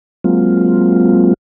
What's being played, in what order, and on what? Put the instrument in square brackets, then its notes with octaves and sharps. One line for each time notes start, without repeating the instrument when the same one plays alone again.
[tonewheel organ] F#3 G#3 A#3 C4 F4